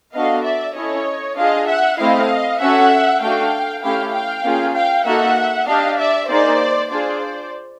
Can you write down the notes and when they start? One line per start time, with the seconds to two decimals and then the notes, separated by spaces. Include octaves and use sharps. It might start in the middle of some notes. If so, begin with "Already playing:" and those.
0.14 B3 D4 F#4 A4 D#5 F5
0.44 D5 E5
0.75 C#4 E4 A4 C#5 D#5
1.37 D4 F4 G#4 D#5 F5
1.68 E5 F#5
1.98 A3 C4 E4 D#5 F5
2.60 C#4 F#4 A4 E5 F#5
3.21 A3 D4 F#4 A4 F5 G5
3.83 A3 C#4 E4 G4 F5 G5
4.13 F5 G5
4.45 A#3 C#4 F4 G#4
4.74 F5 G5
5.05 A#3 D#4 F#4 A4 E5 F#5
5.67 D4 G4 D#5 F5
5.98 D5 E5
6.29 A#3 D#4 G#4 C5 D5
6.90 D4 F4 G#4 C5 D5